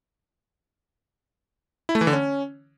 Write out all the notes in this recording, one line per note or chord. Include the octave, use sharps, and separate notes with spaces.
E4
A3
E3
D3
C#4